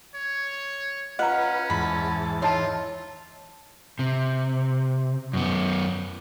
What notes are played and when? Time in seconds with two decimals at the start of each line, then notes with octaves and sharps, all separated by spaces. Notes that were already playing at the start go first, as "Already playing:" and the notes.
0.15 C#5
1.19 C#4 F4 B4 D#5 F#5 A#5
1.70 E2 G#2 A5 B5
2.42 E3 D#4 F4 C#5 A5 C6
3.99 C3
5.33 F#2 B3